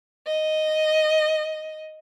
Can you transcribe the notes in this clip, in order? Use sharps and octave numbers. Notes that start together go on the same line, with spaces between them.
D#5